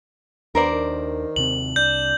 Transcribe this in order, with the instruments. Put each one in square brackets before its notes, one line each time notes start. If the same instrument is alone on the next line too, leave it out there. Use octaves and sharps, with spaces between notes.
[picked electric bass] D#2 D4 [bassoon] B3 [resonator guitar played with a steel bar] A#4 C5 D5
[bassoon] D#3
[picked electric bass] D#2 C3 C4 [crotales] F#7
[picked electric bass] C2 [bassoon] D4 [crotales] G6